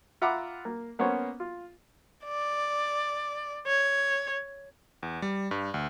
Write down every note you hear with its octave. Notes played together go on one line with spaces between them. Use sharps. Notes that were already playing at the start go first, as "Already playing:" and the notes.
F4 E5 F#5 A#5 B5 D6
A#3
A#3 B3 C#4 C5 C#5
F4
D5
C#5
E2
G3
G2
D2